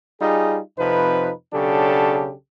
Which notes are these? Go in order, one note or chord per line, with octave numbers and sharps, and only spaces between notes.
G3 D#4 F4 G#4
F2 C3 F3 D#4 B4
B1 C#3 F#3 D4 G4 A4